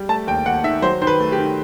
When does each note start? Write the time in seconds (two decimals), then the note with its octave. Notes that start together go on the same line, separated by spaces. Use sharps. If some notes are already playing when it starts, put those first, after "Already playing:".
Already playing: G3
0.09 A3 A5
0.27 D#2 G5
0.46 D#2 F#5
0.64 D#3 E5
0.82 F#3 C5
1.02 D#3 C5
1.07 B4
1.20 A3
1.32 G4
1.38 D#3